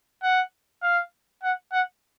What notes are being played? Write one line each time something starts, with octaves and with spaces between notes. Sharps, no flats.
F#5
F5
F#5
F#5